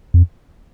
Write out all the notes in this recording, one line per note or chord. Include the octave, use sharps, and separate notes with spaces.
F2